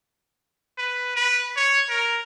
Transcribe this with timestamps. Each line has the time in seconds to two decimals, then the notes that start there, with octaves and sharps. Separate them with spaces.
0.78 B4
1.16 B4
1.56 C#5
1.89 A#4